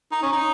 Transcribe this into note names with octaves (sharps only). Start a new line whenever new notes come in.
D#4
C#4
D#4